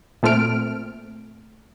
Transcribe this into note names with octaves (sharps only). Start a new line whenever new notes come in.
A#2 A3 C4 F6 D7